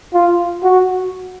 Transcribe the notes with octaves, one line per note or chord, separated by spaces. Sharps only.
F4
F#4